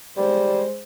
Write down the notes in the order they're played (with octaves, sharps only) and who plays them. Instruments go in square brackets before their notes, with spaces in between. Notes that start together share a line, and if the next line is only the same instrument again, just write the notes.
[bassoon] G3 [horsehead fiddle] G#3 C5